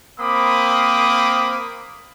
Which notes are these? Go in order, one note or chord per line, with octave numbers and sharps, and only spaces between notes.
A#3 C4 B5 D6 D#6